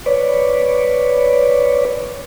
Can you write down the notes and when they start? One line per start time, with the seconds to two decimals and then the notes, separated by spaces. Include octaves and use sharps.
0.06 B4 C#5 D5